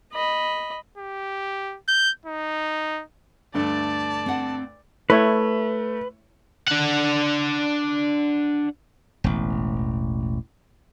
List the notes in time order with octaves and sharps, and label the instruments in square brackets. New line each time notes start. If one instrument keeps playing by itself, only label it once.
[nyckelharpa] D#5 B5
[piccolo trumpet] G4
G6
D#4
[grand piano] D2 G2 A3 [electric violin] D5 [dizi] A5
[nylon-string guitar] C4 F#5
[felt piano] A3 [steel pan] E4 C#5 [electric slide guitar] B4
[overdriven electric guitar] D4 F#5
[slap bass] E1 A1